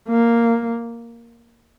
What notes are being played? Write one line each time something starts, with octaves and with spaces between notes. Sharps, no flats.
A#3